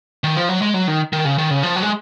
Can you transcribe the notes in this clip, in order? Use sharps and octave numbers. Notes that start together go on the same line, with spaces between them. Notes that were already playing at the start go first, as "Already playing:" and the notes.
D#3
F3
F#3
G#3
F#3
D#3
D#3
C#3
D#3
C#3
F3
F#3
G#3